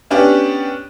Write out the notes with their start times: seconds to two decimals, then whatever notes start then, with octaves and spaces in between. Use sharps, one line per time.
0.11 B3 C#4 D4 G4